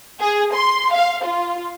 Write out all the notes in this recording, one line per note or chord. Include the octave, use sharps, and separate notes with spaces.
G#4
C6
F5
F4